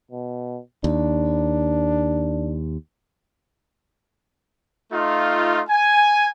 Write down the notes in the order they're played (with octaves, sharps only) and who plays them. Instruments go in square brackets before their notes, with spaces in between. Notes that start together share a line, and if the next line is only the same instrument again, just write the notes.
[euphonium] B2
[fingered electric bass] D#2 [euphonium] D4
[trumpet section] A3 D#4 F4
G#5